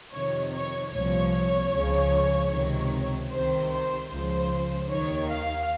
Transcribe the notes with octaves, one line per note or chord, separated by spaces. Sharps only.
F2 C3 D#3 C#5
C#5
C2 A#2 F3 C#5
C#2 C#3 F3
C#2 C3 D#3
C2 C3 D#3 C5
C5
C#2 C#3 F3 C5
D#2 D#3 C#5
F5